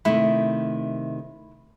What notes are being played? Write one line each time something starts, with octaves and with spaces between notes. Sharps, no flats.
C3 D#3 A3 E4